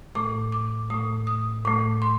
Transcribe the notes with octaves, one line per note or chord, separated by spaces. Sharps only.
A2 A3 D6
D6
A2 A3 D#6
D#6
A2 A3 D6
C6